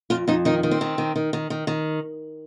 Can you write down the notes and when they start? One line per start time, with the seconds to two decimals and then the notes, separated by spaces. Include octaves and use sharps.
0.10 F2 F4
0.28 F2 D#4
0.45 D#3 D#4
0.63 D#3
0.71 C4
0.81 D#3
0.98 D#3
1.16 D#3
1.33 D#3
1.50 D#3
1.67 D#3